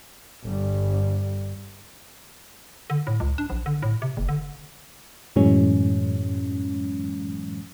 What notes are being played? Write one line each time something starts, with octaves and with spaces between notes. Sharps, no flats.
G1 G3
D3
A2
C#2
D4
A#1
D3
A2
C3
F#1
D3
F#2 A2 E3 F#3 G#3 C#4